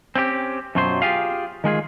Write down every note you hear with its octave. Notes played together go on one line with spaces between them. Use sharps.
C4 C#4 E4 G4
F#2 B2 F#3 F4 A4 C5
F4 G4 G#4 F5
D#3 G#3 F4 G#4